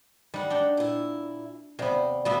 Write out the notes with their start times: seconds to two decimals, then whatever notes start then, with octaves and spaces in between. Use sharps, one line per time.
0.34 G3 D#4 F#5
0.50 D4 F#5 G5
0.77 A#2 E4
1.79 D#2 C3 B3 C5 D5
2.25 F3 G3 G#3 B3 F#4 E5